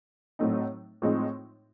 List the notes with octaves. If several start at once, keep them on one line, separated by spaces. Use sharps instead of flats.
A2 F#3 A3 C4 D#4
A2 F3 G#3 C4 D#4